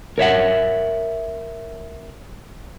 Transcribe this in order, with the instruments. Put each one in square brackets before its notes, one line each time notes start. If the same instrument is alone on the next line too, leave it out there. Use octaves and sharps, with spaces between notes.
[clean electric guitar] A#4 C#5 E5 F#5